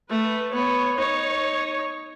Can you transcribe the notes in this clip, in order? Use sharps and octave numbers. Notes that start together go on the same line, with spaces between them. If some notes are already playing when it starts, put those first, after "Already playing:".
A3 B4
B3 C#5
D#4 C#5